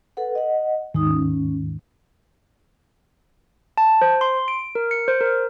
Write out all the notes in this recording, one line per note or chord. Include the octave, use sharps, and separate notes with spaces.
A4 B4 F#5
D#5 F#5
D#2 G#2 D#3 G#3 D#4 D#6
C#4
A5
C5
C6
D7
A#4
C#7
C5
A#4